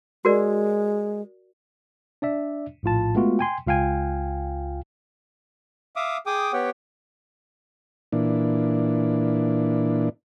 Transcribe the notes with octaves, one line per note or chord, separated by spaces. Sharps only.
G#3 F#4 A#4 D5
D4 D5 E5
A#1 A2 F4 A5
G#3 A3 B3 F4 F#4
G5 G#5 C6
C#2 F4 F5 G5 G#5
E5 F5 D6 D#6
G#4 G5 D6 D#6
B3 G4 C#5 F#5 G5
A#2 E3 D4